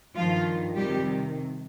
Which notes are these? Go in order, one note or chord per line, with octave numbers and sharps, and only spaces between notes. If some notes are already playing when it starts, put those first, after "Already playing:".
G2 D#3 F3 F4
F2 C3 D#3 G3 G4